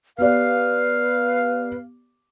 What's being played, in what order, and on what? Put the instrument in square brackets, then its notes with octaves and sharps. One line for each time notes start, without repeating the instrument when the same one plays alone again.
[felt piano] B3 G4 D5 [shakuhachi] B4 [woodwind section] F5